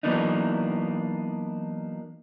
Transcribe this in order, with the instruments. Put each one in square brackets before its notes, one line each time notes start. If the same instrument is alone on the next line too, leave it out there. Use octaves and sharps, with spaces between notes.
[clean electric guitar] E3 F#3 A#3 B3 D4 D#4